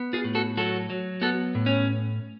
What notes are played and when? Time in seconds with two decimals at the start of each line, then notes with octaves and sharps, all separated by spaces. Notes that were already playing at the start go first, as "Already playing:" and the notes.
Already playing: B3
0.13 F4 G#4
0.24 A2
0.35 F#4 A4
0.57 F#3 F#4 A4
0.90 F#3
1.21 B3 F#4 A4
1.55 A2
1.66 C#4